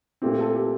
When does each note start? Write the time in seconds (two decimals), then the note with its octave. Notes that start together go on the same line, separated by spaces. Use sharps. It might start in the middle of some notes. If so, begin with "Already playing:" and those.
0.22 A#2 A3 C4 G4
0.39 A4
0.56 G4